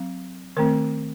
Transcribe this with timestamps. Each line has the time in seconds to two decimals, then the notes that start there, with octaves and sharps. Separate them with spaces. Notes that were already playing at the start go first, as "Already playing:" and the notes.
Already playing: F#3 C4
0.57 D#3 A3 C4 A#4